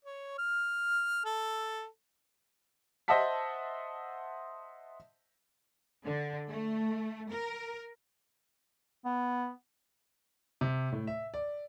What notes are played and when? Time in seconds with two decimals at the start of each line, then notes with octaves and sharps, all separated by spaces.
0.05 C#5
0.38 F6
1.25 A4
3.08 C5 D#5 E5 F#5 A5 B6
6.04 D3
6.48 A3
7.31 A#4
9.05 B3
10.61 C3
10.92 A2
11.07 E5
11.34 D5